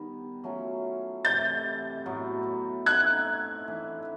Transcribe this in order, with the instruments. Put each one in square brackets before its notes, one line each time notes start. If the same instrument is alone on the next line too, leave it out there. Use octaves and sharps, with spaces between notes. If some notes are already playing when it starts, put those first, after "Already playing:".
Already playing: [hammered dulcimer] D#3 G3 B3
F#3 A3 C#4 F4
[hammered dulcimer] C3 E3 A3 C4 [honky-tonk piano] G6 A6
[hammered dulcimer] A2 F#3 B3
[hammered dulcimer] A3 C4 D#4 [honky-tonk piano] F#6 G#6
[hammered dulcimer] E3 A3 D4